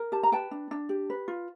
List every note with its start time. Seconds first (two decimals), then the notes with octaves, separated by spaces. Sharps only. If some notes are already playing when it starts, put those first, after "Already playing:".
Already playing: A#4
0.12 G4 A5
0.23 A#5
0.32 B4 G5 A5
0.51 D4
0.71 D4
0.89 G4
1.10 B4
1.28 F4